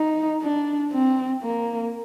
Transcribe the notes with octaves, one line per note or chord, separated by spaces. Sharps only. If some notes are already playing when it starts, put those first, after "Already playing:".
Already playing: D#4
D4
C4
A#3